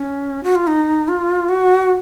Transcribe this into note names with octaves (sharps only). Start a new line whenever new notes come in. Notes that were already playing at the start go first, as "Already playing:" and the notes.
Already playing: C#4
F#4
F4
D#4
F4
F#4